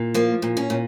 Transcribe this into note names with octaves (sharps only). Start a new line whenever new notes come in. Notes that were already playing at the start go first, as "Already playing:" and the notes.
Already playing: A#2
F3 A#3
A#2
C#4
A#2